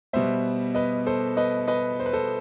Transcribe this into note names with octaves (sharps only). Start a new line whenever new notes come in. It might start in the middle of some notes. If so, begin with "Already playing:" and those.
B2 G3 B3 C5 E5
B4 D#5
A4 C5
B4 D#5
B4 D#5
C5
B4
A4 C5